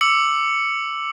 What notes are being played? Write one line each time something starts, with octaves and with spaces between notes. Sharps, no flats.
D6 E6 C#7 F#7